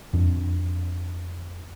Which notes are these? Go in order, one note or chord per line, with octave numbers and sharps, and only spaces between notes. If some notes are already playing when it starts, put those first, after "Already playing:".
F2 D4